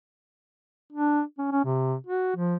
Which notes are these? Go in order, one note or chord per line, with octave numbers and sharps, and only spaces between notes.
D4
C#4
C#4
C3
F#4
F3